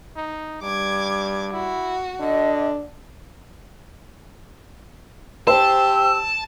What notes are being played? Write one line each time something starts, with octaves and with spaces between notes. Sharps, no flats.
D#4
G2 G3 D6 G#6
E4 F#4
D3 D4 D#5
G4 C5 A5 E6